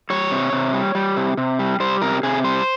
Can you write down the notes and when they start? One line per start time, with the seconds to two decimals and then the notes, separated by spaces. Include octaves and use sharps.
0.10 G3 C#5
0.32 C3
0.53 C3
0.74 G3
0.95 G3
1.17 C3
1.37 C3
1.59 G3
1.80 G3 C5
2.02 C3 A#4
2.23 C3 G#4
2.44 G3 C5